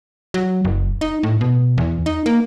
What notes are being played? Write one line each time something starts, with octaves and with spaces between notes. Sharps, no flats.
F#3
F#1
D#4
A2
B2
E2
D#4
A#3